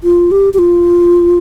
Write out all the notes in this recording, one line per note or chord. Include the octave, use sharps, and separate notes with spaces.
F4
G4
G4
F4